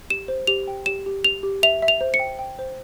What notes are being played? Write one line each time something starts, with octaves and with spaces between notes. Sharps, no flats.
G4 E7
C5
G4 F7
G5
G4 E7
G4
G4 F7
G4
E5 F7
E5
F7
C5
C#7
G5
G5
C5